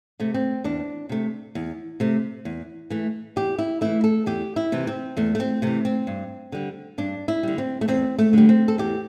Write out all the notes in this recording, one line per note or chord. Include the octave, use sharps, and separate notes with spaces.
C3 A3
C4
E2 D4
C3 A3
E2
C3 A3
E2
E3 A3
E2 G4
E4
E3 A3 E4
A4
E2 G4
E4
C3 E3
C4
E2 A3
A3
C4
C3 E3 A3
C4
G2
D3 G3
G2 D4
E4
D3 G3
C4
A3
E2 C4
A3
D3 G3
C4
A4
E2 G4